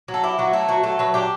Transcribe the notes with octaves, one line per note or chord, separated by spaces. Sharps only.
F#3
A4
E4 G4
F#3 F#4
A3 E4
F#3 F#4
A3 A4
F#3 B4
D4 G4